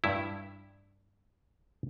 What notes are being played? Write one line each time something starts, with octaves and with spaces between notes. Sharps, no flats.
G2 E4